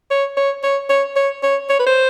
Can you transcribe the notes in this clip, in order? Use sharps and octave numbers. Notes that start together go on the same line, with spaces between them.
C#5
C#5
C#5
C#5
C#5
C#5
C#5
B4
C5